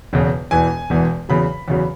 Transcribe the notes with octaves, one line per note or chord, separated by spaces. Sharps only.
E1 E2 C#3
E1 E2 E3 G#5
E1 E2 E3
E2 C#3 F#3 B5
E2 C#3 F#3